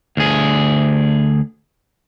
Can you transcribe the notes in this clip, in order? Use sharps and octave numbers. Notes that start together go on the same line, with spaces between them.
D2 G#4